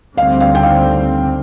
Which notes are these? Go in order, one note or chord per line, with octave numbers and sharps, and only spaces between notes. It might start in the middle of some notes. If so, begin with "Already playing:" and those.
D2 D3 G3 C4 F5
F5
G5
F5